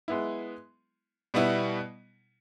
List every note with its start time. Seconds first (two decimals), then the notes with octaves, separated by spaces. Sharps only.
0.08 G#3 B3 E4
1.34 B2 G3 B3 E4